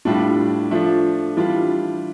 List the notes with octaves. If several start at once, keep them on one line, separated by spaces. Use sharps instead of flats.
A2 G3 D4 F4
F3 A3 D4 F4
E3 G3 D4 F4